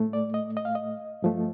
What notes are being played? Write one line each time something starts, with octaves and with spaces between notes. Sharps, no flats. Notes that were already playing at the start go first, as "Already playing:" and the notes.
Already playing: A2 A3
D5
D#5
D#5
F5
D#5
G2 F3 A3